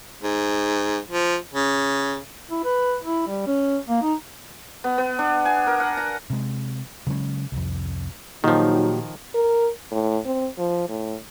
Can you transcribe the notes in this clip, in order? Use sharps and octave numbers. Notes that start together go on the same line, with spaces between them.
G#2
F3
C#3
E4
B4
E4
G3
C#4
A#3
D#4
B3
B3
D4
G#5
A#4
F#5
A#5
C3 G#3
C#3 F#3 G#3 C#4
C2 F2
A#1 A#2 D#3 F3 F#3 D#4 F#4 G4
A#4
A2
C4
F3
A2